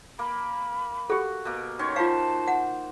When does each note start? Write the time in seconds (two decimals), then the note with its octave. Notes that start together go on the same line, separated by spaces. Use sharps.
0.19 A#3 B5
1.10 F#4 G4 A4
1.45 B2 A#3
1.79 D#3 C#4 C#5 C6
1.96 F4 C5 F5 A5
2.48 F#5